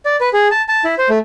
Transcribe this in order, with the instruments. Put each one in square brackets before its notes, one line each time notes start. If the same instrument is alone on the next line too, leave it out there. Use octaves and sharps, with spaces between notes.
[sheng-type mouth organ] D5
B4
G#4
A5
A5
E4
C5
A3